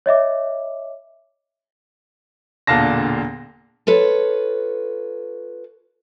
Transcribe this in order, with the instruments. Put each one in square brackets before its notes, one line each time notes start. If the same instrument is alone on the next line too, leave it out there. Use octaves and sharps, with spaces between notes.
[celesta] C#5 D#5 E5 D6
[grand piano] E1 A#2 D3 F5 A5 A#6
[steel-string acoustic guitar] F4 A4 B4 C#5